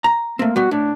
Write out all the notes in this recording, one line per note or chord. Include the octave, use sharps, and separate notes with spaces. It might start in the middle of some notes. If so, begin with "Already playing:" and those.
A#5
A3 A#3 C4
G3 B3 F#4
A2 D4